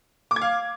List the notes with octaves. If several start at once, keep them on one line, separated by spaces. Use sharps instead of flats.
D6
G#6
F5